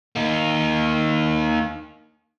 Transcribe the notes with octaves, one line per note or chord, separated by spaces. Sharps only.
A#3 D#4